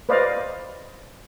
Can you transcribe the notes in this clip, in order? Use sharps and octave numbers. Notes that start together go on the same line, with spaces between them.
B4 C5 D5 D#5 F5